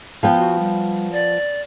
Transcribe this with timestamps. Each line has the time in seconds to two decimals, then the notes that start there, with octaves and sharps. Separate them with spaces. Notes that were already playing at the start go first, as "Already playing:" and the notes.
0.23 F3 B3 G5
0.37 F#4
0.59 G3
1.12 D5